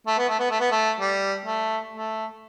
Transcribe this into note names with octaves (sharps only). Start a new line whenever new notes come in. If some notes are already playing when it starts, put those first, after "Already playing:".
A3
B3
A3
B3
A3
B3
A3
G3
A3
A3